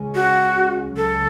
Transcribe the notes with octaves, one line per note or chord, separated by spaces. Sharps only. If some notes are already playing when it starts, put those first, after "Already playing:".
Already playing: C#2 C#3 G#3 C#4
F#4
C#2 C#3 F#3 A4